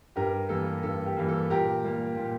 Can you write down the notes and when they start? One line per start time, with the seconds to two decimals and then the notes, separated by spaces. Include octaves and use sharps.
0.16 G2 G4 A#4
0.49 E3 G3 A#3 A4
0.83 G2 A4
1.06 G4
1.17 E3 G3 A#3
1.28 A4
1.50 A#2 G4 A#4
1.84 G3 A#3
2.17 A#2